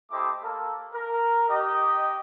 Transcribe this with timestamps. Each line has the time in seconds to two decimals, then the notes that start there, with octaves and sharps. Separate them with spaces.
0.10 A3 E4 G4 C5 D#5 D6
0.42 A#3 A4
0.93 A#4
1.49 G4 D#5